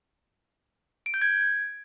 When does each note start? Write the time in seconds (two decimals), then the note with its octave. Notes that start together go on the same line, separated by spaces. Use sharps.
1.06 D7
1.14 G6
1.22 G#6